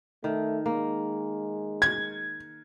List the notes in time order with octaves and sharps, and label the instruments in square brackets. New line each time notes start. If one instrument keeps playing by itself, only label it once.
[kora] D#3 [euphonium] A3
[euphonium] G#3 [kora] A#3
[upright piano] G#6